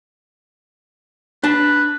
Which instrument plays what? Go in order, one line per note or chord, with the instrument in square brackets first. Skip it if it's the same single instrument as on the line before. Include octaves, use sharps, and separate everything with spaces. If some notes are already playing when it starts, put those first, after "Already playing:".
[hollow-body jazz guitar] D4 A5 [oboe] B4